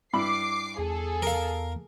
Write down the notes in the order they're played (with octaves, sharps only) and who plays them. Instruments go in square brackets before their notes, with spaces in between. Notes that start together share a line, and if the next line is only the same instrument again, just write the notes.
[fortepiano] G2 E4 B5 [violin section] D6 C7
[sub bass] E2 [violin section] G#4 A4
[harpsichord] A#4 F5